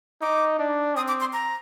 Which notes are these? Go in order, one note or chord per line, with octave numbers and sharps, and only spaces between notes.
D#4 D6
D4
C4 D#6
D6
C6
A#5